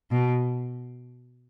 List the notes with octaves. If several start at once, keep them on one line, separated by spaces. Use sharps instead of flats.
B2